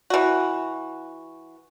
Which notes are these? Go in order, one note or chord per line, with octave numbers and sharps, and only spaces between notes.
E3 F#4